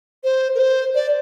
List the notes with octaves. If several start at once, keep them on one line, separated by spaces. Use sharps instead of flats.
C5
A#4
C5
D5